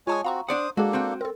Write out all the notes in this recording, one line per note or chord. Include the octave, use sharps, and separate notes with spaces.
G#3 F4 C#5 G#5 A5 D#6
C4 F#4 F5 A#5 C#6
D4 C5 D5 F#5 D#6
G#3 A#3 D4 F#4 G#4 A4
C4 F#4 G5
C4 A4 A#4